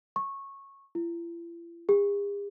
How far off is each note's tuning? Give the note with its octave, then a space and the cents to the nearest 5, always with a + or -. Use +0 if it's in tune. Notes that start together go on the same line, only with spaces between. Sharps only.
C#6 -15
E4 +45
G#4 -45